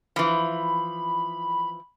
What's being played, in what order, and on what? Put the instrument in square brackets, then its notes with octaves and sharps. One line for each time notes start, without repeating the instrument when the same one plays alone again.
[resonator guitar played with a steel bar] E3 F3 [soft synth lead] B5